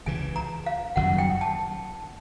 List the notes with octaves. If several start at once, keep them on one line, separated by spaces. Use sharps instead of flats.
C#2 C#3 E3 G#5
A#5
F5
F#1 F#2 D#3 G3 F#5
G5
A5